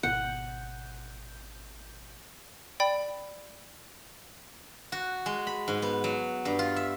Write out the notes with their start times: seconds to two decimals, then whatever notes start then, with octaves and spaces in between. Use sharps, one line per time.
0.03 G#1 B2 F#5 G6
2.80 D5 G5 B5
4.92 F#4
5.26 G#3
5.47 B5
5.68 G#2
5.82 B3
6.04 F#3
6.45 G2
6.59 F4
6.76 E5